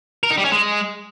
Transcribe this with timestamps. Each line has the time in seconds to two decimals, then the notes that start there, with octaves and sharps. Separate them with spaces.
0.23 A#4
0.30 D#4
0.38 G3
0.45 C#4
0.52 G#3